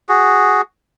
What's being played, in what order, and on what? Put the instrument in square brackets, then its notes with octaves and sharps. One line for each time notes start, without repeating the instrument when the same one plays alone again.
[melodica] F#4 G#4